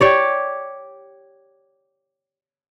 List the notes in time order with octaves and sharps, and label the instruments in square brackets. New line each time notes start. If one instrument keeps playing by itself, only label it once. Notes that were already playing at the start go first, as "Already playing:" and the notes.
[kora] G4 C#5 D5